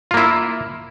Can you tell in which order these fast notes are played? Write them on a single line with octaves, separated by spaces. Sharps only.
F4 A#3 E4